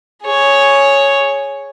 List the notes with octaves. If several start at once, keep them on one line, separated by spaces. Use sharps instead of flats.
G#4 C#5